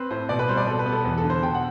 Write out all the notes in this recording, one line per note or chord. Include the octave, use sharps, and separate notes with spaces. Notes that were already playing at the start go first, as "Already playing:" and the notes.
Already playing: C4 B4
A2 C5
B2 D5
B4
G3 C5
D5
B2 A4
B4
B3
A4
E2
A4
D3
C5
B2 G5
F#5